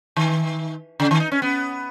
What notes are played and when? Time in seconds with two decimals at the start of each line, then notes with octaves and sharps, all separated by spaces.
0.17 D#3
1.00 C#3
1.11 D#3
1.20 D#4
1.32 C#4
1.42 B3